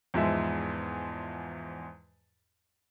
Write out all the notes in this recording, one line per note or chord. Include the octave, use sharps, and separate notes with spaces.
E2 G#2 F3 G#3 E5